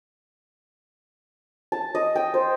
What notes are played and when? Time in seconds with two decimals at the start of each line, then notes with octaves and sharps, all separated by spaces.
1.72 A5
1.95 D#5
2.16 G5
2.34 C5